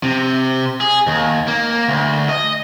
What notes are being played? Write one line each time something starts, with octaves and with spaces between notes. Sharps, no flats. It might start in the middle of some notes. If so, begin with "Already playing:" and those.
C3
G#4
D#2
A#3
D2
D#5